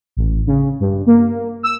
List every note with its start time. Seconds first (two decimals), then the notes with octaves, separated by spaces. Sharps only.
0.17 A1
0.47 C#3
0.80 G2
1.06 A#3
1.63 E6